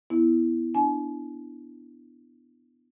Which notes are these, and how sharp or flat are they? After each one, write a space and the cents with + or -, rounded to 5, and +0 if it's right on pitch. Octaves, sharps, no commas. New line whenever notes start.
B3 +0 E4 +0
D4 +0 G#5 +45